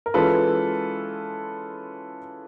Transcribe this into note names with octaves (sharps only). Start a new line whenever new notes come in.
A#4
E3 G#3 C#4 F4 A4 B4